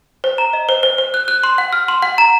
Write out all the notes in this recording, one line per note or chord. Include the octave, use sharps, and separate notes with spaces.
C5
A#5
D#5
C5
C5
C5
F#6
F#6
C6
F#5
F6
C6
F#5
A#5